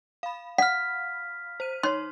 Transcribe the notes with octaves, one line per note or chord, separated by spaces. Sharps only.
F5 B5
F#5 F6 B6
C5 D#7
D#4 C#5 C6